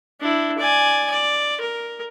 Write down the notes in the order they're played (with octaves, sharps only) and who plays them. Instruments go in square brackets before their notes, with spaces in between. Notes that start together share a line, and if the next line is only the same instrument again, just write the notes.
[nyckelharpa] D4 E4
D5 G#5
D5
A#4